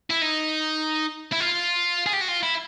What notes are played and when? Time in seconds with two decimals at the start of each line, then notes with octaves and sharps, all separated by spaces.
0.10 E4
0.22 D#4
1.32 E4
1.40 F4
2.06 G#4
2.13 G4
2.21 F#4
2.28 F4
2.43 E4